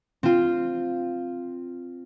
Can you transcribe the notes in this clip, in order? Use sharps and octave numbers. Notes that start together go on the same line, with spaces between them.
C4 F4